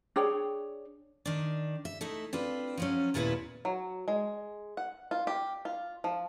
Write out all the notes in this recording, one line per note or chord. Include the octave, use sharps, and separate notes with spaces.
D4 G#4 C#5 G5
D#3 D4
E5
A3 D#4 E4
C4 D4 F4 B4
F3 F#3 C#4
D#2 A#2 B3 E4 G#4 B4
F#3
G#3
F#5
F4
G4
F4
F3